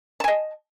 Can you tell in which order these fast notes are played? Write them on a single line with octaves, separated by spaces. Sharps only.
A5 G#5 D#5